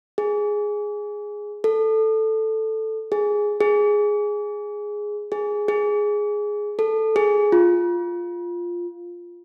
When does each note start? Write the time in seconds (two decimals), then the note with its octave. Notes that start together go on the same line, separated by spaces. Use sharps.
0.18 G#4
1.64 A4
3.12 G#4
3.61 G#4
5.32 G#4
5.68 G#4
6.79 A4
7.16 G#4
7.52 F4